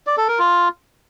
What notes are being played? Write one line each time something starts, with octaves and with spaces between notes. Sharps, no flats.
D5
A4
A#4
F4